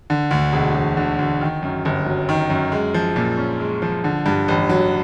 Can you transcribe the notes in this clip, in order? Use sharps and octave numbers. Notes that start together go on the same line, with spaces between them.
D3
D2
E1
E1
D3
D2
D#3
F#2
G1
F#3
D#3
F#2
G#3
F3
A#2
C#4
G#3
F3
D3
G2
A1
F#3